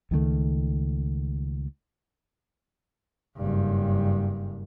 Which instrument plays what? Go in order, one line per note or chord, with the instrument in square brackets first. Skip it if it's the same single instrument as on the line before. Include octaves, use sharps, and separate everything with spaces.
[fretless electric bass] C#2 D#3 F#3 A3
[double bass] F#1 G2